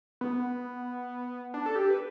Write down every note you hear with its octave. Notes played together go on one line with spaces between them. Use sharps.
B3
D4
A4
G4
B4